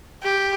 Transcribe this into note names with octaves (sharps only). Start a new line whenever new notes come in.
G4